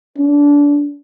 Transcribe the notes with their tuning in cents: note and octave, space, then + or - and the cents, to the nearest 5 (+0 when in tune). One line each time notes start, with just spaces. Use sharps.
D4 -25